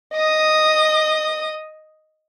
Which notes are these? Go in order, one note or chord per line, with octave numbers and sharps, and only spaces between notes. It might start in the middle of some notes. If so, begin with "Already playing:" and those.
D#5 D#6